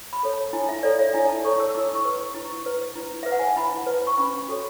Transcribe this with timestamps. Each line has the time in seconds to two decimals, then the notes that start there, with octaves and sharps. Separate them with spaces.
0.13 B5
0.23 A4 C#5
0.33 A5
0.53 E4 G#5
0.69 E5
0.83 A4 C#5 D5
0.99 E5
1.14 E4 G#5
1.29 A5
1.44 A4 C#5 C#6
1.60 E6
1.70 E6
1.75 E4 D6
1.95 C#6
2.05 B4
2.14 C#6
2.35 E4
2.66 B4
2.96 E4
3.23 B4 E5
3.32 F#5
3.39 G#5
3.48 A5
3.56 E4 B5
3.86 B4
4.07 C#6
4.18 C#4 B5
4.48 F#4 A4 C#5